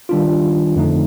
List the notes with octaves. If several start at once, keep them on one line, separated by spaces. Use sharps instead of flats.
D#3 G3 D4 F4
F2 D3 A3 D#4